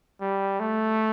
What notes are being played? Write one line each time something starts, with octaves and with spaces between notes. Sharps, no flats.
G3
A3